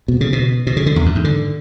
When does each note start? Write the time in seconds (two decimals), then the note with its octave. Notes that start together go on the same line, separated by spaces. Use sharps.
0.08 B2
0.21 C#3
0.33 B2
0.67 B2
0.77 C#3
0.86 D3
0.96 E2
1.06 F#2
1.15 G#2
1.24 D3